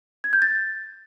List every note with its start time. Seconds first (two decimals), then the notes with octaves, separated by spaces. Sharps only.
0.24 G#6
0.33 G6
0.42 A6